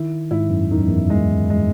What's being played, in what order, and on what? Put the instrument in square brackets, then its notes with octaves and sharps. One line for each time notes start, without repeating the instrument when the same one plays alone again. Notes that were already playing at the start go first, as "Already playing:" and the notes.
Already playing: [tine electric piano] D#3 [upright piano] E4
[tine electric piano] G#2 [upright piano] E4
[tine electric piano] F#2
[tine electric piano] E2 [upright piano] D#3
[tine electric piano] F#2
E2
[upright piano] G#3
G#3